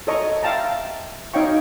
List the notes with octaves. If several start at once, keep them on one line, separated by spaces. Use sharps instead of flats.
A4 C#5 D#5 A#5 C#6
E5 F5 G5 A5 A#5
D#4 C#5 F5 G5 C#6